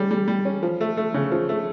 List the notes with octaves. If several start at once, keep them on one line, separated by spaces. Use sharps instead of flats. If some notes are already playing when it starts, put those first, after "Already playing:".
Already playing: G3 C#4
G3
G3
C#4
F3
A3
A3
C#3
F3
A3